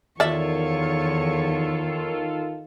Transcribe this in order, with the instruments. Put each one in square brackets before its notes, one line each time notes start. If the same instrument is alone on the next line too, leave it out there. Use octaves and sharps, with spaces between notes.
[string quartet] E2 C#5 [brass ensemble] D#3 [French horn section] F4 A4 [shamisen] D5 E5